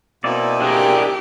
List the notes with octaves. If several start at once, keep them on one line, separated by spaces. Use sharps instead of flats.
B2 A#3 C4 D#4 E4 D5
D4 G4 G#4 A#4